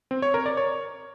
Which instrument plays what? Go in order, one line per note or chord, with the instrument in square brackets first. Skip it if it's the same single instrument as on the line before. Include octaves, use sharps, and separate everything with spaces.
[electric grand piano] C4
C#5
A#4
D5
C#5